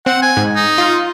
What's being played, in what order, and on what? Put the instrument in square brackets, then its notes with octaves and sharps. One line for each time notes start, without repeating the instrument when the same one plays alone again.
[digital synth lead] C4 [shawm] F#5
[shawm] G#5
[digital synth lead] G#2
[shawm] D#4
[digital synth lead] F4